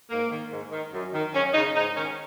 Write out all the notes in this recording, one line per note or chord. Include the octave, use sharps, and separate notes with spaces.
G#2 A#3
D#3
G#2
D#3
F#2
D#3
F#2 C#4
C#3 D#4
G#2 D#4
D#3 C#4